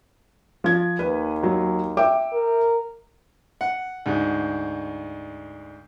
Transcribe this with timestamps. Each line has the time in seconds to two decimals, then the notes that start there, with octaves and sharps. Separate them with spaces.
0.64 F3 G#6
0.99 D#2 B4
1.43 F#3
1.97 E5 G5 D6
2.33 A#4
3.61 F#5
4.06 D2 G#2